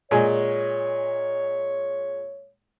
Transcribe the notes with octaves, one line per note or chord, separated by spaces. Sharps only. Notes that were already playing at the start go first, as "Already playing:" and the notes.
A#2 G#3 C#5 G#5